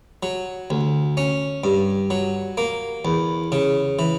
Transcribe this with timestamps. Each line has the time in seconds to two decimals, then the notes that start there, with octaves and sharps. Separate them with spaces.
0.23 F#3
0.70 D2
1.17 C#4
1.64 G2
2.10 F#3
2.58 A#3
3.05 E2
3.52 C#3
3.99 E3